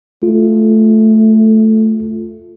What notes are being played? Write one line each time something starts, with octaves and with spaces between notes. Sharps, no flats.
A3 F4